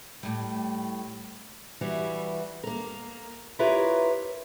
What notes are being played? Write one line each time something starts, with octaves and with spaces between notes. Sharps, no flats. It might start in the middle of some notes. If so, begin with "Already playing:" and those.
A2 G3
E3 G3 E4 F#4
A#3 A#4
E4 F4 G4 A#4 B4 C#5